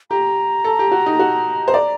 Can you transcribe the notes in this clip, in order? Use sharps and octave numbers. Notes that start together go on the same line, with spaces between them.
G4 A#5
A4
G4
F#4
D#4
F#4
C5
D5